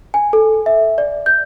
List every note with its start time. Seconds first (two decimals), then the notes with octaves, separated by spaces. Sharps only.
0.14 G#5
0.33 A4
0.66 E5
0.98 D5
1.26 G6